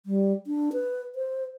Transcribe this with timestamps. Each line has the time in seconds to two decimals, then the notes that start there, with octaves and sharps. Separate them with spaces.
0.06 G3
0.47 D4
0.73 B4
1.15 C5